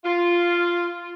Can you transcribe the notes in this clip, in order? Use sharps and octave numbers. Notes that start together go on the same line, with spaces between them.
F4